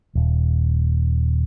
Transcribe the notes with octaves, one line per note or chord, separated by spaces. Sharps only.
D#1